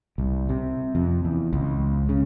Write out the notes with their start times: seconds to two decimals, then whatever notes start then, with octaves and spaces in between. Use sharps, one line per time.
0.18 C2
0.49 C3
0.95 F2
1.25 E2
1.53 C#2
2.09 C#3